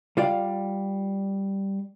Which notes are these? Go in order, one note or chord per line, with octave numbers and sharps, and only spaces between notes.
G3 F4 D5 F5